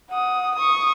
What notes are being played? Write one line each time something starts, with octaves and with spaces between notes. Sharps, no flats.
F#5 D#6
C#6 D#6